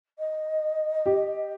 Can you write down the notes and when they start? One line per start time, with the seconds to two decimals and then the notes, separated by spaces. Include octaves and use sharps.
0.19 D#5
1.06 G4